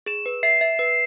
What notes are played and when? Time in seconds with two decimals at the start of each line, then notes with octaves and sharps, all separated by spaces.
0.06 G#4 E7
0.26 B4
0.43 E5 C7
0.61 E5
0.79 B4